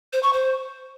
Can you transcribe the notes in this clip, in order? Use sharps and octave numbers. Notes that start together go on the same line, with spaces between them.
C5
C#6
C5